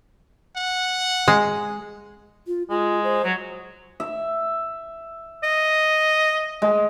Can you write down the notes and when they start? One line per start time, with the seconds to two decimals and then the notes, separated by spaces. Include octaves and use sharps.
0.56 F#5
1.28 G#3
2.47 F4
2.70 G#3 F4
3.04 C5
3.24 F#3
4.00 E5
5.44 D#5
6.62 G#3